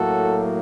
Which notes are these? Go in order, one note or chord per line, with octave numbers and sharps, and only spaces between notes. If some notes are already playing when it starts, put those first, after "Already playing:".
Already playing: A2 F#3 A#3 F#4 A4